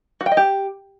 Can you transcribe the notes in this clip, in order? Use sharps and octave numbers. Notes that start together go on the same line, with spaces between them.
F#4
G5
D#5
G4